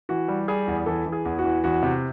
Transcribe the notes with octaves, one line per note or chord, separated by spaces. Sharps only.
E3 F#4
G3
G3 G#4
E2
E3 A4
E3
G#4
E2
F#4
E3
E2 F#4
C3